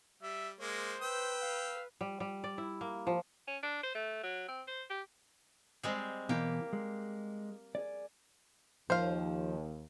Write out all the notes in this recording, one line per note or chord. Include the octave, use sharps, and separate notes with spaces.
G3 E5
G#3 A#3 C5
B4 G5 E6
F5
G3
G3
D5
E4
A#3
F3
C#4
D4
C5
A3
F#3
C4
C5
G4
G3 G#3 C4
B2 E3 A#3 G4
G#3
G#4 D5
D#2 F3 C5 F5